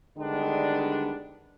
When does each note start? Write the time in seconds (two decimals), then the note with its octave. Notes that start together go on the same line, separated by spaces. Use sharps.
0.18 D3 D#3 G3 G#3 B3 D4